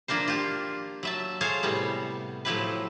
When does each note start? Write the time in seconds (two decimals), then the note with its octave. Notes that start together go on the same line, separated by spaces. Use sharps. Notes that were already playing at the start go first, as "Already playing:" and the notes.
0.08 F3 A#3 D4 A#4 C5
0.28 F4 G4
1.03 F#3 E5 A5
1.41 G#4 A4 C5 C#5 F5
1.63 A2 C3 G3 B3
2.45 A2 F3 F#3 E4 G4 B4